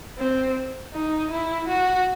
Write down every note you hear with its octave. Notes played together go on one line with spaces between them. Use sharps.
C4
D#4
E4
F#4